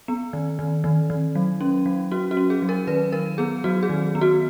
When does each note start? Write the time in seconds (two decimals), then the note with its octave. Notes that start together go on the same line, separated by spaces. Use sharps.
0.08 B3
0.33 D#3
0.59 D#3
0.84 D#3
1.10 D#3
1.35 F#3
1.61 C#4
1.86 F#3
2.11 C#4 F#4
2.31 F#4
2.37 C#4
2.50 G#4
2.62 F#3
2.69 A#4
2.87 D#3 B4
3.13 F#3 A#4
3.38 B3 G#4
3.64 F#3 F#4
3.83 G#4
3.89 D#3
4.15 B3
4.21 F#4